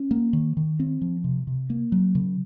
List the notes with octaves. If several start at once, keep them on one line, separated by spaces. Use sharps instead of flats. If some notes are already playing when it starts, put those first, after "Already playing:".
Already playing: C#4
A#3
D#3
D#3
C4
F3
C3
C3
A#3
F#3
C#3